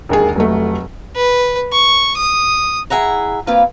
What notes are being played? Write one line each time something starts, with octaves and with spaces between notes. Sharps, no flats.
E1 D#2 G#4
F1 F#3 A3
B4
C#6
D#6
E4 G#4 E5 F#5 A#5
A#3 C4 F4 B4 F5